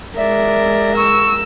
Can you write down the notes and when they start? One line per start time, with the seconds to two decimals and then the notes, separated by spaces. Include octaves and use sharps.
0.17 G#3 A#4 D5 E5
0.96 C#6 E6